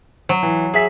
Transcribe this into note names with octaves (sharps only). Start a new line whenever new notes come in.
F#3
E3
G#4 E5 B6